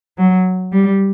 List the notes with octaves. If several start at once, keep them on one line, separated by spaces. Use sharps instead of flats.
F#3
G3